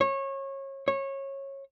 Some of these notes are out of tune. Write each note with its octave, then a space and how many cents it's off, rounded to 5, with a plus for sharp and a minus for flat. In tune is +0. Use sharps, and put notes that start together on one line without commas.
C#5 -25
C#5 -20